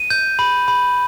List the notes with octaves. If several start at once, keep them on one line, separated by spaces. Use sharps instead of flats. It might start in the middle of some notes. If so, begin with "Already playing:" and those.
Already playing: D#7
G6
B5
B5